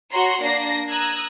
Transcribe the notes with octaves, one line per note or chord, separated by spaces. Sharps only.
F#4 C#5 A#5 C6
A#3 D4 A#6 C7
A#5 D#6 E6 F#6 G#6